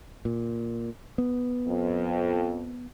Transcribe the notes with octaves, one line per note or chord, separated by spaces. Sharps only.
A#2
B3
F2